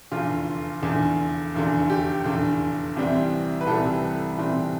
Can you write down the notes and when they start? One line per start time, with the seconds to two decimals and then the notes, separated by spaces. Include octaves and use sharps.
0.12 F1 E2 D3 F4
0.82 F1 E2 D3
1.54 F1 E2 D3
1.90 G4
2.24 F1 E2 D3
2.96 C2 C3 E3 G3 C4
3.61 B4
3.67 C2 C3 E3 G3 C4 A4
4.39 C2 C3 E3 G3 C4